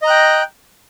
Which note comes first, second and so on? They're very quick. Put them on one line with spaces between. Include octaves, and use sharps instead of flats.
D#5 A#5 F#6 G5